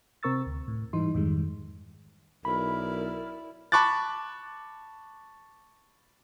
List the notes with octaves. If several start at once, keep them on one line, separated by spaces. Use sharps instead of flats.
C3 C4 A#4 C#6 E6 A6
D2
A2
G#2 E3 G3 D#4 C6
F2 G#2 D#3 G3 G#3
B1 E4 A#4 D5 B5
A5 B5 C#6 D6 F#6 A6